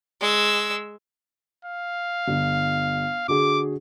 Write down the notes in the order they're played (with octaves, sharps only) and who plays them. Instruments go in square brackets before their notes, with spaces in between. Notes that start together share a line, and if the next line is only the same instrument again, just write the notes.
[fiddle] G#3 E6
[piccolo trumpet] F5
[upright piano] G1
[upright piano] D3 F#4 G#4 [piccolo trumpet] D6